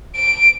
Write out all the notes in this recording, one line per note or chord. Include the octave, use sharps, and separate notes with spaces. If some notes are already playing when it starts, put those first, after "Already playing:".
D7